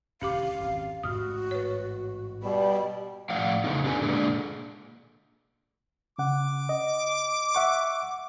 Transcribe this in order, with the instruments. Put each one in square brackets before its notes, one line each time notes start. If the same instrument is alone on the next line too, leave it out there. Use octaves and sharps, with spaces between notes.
[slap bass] E1 D#2 D3 [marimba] C#4 G4 D6 [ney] F5
[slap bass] D#1 G#1 C4
[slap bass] A1 G#2 [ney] F#4 [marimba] D#6 F6
[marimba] B4 C#5
[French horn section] B2 G3 [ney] B5
[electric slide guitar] A2 F3 D5 F5 F#5
E2 C#3 A3 B3 D#4
C#4 D4 G4 B4 G#5
A#2 D3 G#3 D4
[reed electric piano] C#3 F#5 [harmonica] D6
[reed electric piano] D#5
E5 F#5 C#6